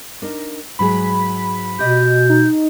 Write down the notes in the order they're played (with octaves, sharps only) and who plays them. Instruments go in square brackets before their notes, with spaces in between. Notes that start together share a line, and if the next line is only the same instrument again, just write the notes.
[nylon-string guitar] D4 D#4 A#4
[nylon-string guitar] G#2 F#3 G#4 [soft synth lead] B5
[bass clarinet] B2 [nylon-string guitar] G4 D#5 [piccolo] G6
[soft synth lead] D#4